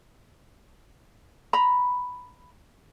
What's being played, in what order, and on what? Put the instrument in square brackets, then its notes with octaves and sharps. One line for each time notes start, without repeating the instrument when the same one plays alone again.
[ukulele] A#5 B5